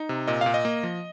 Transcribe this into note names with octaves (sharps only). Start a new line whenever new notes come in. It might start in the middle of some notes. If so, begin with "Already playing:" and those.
Already playing: D#4
C3
A#2 D#5
A#2 F5
D#5
A#3
F3